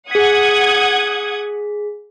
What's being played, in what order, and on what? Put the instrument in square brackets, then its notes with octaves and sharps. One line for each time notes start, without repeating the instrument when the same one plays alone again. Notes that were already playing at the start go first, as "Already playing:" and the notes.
[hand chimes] G#4 B6 [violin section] F#5 D#6 G#6